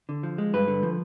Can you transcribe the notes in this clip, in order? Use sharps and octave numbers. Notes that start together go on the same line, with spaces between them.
D3
F3
G#3
G2 B4
D3
F3